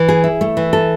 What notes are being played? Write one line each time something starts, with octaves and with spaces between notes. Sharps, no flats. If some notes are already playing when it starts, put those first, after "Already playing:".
Already playing: E3
G#4
E4
A3
E3
A4